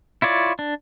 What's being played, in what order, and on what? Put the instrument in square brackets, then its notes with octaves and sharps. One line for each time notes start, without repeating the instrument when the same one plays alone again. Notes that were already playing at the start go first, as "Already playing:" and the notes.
[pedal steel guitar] E4 F4 C#5 D5
D4